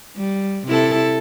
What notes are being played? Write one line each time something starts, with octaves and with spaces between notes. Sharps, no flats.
G3
C3 E4 A4